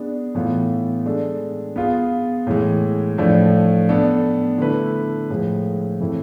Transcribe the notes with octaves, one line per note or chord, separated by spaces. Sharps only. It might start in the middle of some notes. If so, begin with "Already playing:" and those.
Already playing: B3 D4 G#4
A2 E3 B3 F4
G#3 D4 A4
B3 F4 G#4
A2 E3 G#3
A2 F3 A3 D4
B3 D4 A4
D3 A3 E4 B4
A2 F3 G#3
A2 E3 A3 C4 E4